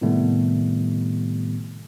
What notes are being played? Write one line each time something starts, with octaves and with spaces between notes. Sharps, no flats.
A2 C3 D#3 G3 A3 B3